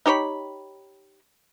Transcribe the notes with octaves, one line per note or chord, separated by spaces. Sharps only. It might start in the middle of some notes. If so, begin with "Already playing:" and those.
D#4 G4 C#5 B5